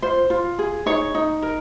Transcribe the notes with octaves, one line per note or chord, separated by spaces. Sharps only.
F4 C5
F4
G#4
D#4 C#5
D#4
A#4